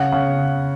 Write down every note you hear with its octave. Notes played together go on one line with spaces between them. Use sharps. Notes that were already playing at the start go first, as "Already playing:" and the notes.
Already playing: C#3 F#5
C#3